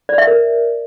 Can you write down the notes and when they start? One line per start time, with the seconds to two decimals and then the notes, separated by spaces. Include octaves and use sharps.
0.09 D5
0.18 E5
0.27 A#4